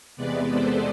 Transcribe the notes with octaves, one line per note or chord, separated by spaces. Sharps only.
E2 C3 G#3 B3 B4 D5
A4 C5